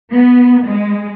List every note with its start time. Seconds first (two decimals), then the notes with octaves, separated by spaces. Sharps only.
0.13 B3
0.64 G#3